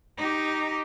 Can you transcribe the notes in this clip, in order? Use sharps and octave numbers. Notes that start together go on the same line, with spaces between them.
D#4 G4